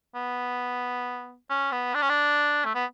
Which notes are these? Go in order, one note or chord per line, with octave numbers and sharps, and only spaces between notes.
B3
C#4
B3
D4
C#4
D4
A3
B3